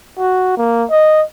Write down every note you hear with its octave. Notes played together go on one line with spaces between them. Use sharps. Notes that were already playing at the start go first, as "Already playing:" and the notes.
F#4
A#3
D#5